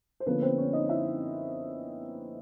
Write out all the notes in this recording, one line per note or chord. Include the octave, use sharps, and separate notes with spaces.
C5
D3 F3 A#3 B3 C#4 B4
C4 C5
C#4 C#5
D#4 D#5
E4 E5